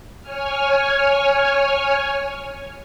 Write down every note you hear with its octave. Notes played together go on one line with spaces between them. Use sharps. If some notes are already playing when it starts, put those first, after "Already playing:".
C#5 G#5 F6